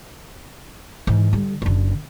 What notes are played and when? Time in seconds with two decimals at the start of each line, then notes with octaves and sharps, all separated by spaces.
1.07 G#2 E3
1.33 D3 G3
1.62 F#1 D3